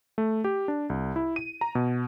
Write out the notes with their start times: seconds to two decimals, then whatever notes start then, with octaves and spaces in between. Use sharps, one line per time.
0.18 A3
0.44 G4
0.68 D4
0.90 C2
1.16 E4
1.36 D#7
1.61 A#5
1.75 B2